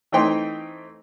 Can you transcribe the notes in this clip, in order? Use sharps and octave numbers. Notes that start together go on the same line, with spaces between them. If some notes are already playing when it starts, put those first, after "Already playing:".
E3 A3 C4 D#4 G5 C6